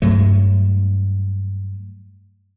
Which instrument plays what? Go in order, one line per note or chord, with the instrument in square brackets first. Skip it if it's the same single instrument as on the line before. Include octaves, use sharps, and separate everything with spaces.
[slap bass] G2 F#3 A3